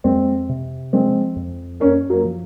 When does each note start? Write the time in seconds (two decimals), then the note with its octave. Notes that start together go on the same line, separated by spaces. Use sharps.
0.04 F2 G#3 C4
0.49 C3
0.93 F3 G#3 C4
1.36 F2
1.80 F#2 A#3 C#4
2.10 F#3 A#3
2.25 F3